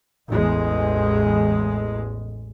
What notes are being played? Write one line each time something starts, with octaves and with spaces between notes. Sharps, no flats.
A1 E2 G#3